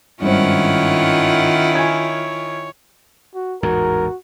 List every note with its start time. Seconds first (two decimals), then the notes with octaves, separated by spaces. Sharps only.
0.22 G#1 G2 D#3 C#4 E4 F4 C5 F#5
1.75 C#5 G#5 G#6
3.35 F#4
3.63 A1 E2 G#2 F#4 A#4